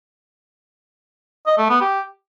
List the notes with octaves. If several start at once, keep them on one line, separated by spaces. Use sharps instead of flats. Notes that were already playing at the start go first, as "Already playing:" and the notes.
D#5
A3
B3
G4